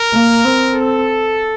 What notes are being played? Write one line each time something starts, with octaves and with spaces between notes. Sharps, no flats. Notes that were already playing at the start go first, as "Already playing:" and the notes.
Already playing: A#4
A#3
C4
A4